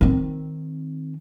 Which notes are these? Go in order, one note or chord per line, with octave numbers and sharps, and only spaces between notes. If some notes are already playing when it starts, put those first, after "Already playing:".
D#3 C4